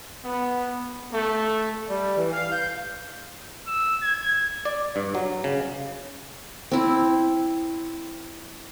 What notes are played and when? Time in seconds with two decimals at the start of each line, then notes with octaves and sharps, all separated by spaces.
0.24 B3
1.12 A3
1.89 G3
2.17 E3
2.32 F5
2.52 G6
3.67 E6
4.03 G#6
4.65 D5
4.96 G2
5.15 F#3
5.44 C#3
6.72 C4 E4